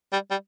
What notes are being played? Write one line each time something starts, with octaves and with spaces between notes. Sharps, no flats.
G3
G3